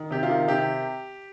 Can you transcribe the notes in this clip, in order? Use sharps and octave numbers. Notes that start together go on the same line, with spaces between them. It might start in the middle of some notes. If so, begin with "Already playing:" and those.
Already playing: D#3
C3 G4
F4
D#3
C3 G4